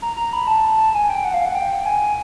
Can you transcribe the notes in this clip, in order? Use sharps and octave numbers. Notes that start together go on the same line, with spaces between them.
A#5
A#5
B5
A5
G#5
G5
F#5
F5
F#5
G5
G#5